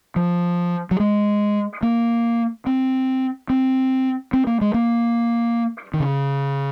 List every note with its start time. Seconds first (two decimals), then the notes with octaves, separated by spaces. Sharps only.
0.16 F3
0.91 F#3
1.00 G#3
1.83 A#3
2.67 C4
3.50 C4
4.33 C4
4.47 A#3
4.61 G#3
4.74 A#3
5.94 D#3
6.00 C#3